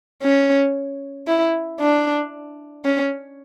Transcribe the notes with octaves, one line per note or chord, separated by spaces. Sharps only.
C#4
E4
D4
C#4